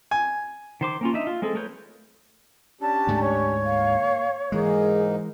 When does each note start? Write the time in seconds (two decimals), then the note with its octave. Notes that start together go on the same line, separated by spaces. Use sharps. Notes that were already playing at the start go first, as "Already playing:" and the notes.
0.11 G#5
0.81 D#3 C5 D6
1.01 A#3 C#4 F4
1.13 D4 D#4 E5
1.27 F4
1.42 G#3 C4 G#4 A4
1.55 A3 A#4 B4 C#5 G6
2.81 C#4 D4 G4 A5
3.07 D2 G#2 A3
3.21 C#5
3.65 A#3 F5
4.52 G#2 E3 G#3 A#3 D#4 G#4